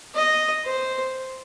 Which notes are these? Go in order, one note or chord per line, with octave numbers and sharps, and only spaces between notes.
D#5
C5